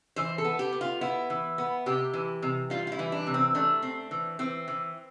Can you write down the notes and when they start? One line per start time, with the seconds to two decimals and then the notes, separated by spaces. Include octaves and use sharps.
0.16 E3 C5
0.38 A4
0.44 B3
0.59 G4
0.73 B3
0.81 F4
1.01 B3 E4
1.30 E3
1.58 B3
1.86 C3 G4
2.14 E3
2.42 C3
2.70 G3 F4
2.87 F4
2.92 E4
2.99 E3
3.12 D4
3.27 C3
3.34 C4
3.55 A3 D4
3.82 C4
4.11 E3
4.39 E3 C4
4.68 E3